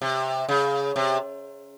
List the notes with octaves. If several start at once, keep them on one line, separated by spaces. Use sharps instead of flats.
C3
C#3
C3